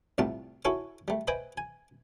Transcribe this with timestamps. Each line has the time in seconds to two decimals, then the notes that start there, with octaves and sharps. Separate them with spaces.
0.18 C2 A2 C3 G3 F4 A5
0.65 E4 F#4 A4 C#5 G#5 C#6
1.08 G3 A3
1.28 B4 C5 D#5 E5 G5 G#5
1.58 G#5